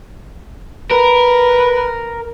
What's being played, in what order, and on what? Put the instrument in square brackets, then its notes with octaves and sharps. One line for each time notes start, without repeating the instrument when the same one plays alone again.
[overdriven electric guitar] A#4 [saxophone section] B4